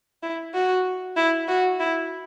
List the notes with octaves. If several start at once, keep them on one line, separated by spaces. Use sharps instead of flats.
E4
F#4
E4
F#4
E4